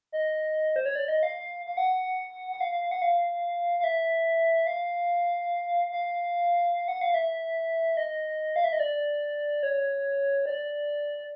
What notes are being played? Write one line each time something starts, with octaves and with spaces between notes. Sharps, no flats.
D#5
C5
C#5
D5
D#5
F5
F5
F#5
F#5
F5
F5
F5
F#5
F5
F5
E5
F5
F5
F#5
F5
E5
D#5
F5
E5
D#5
D5
C#5
D5